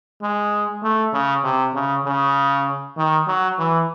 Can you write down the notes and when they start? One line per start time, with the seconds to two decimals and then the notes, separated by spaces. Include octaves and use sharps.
0.22 G#3
0.83 A3
1.13 C#3
1.44 C3
1.74 C#3
2.05 C#3
2.97 D#3
3.27 F#3
3.58 E3